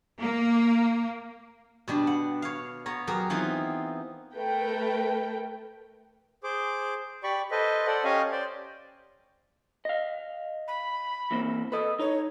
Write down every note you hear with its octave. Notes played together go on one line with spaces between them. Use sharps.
A#3
B2 G3 D4
F#5
C#5 F5
B3 C#5 A#5
F#3 G4 G#4 A#4
E3 B3 C4 D#4 F4
A3 A#4 B4 G5
G#4 C5 D6
G4 D5 B5 C#6
A4 B4 C5 D#5
A4 C5 D5 F#5
C#4 G4 C#5 D#5 F5 G#5
C5 D5
D#5 F5
B5
E3 A#3 C4
A4 B4 D#5
D#4 C#5